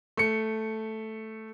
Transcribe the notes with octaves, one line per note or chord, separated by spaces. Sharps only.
A3 C#7